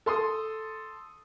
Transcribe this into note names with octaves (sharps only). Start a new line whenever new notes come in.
A4 C6 D#6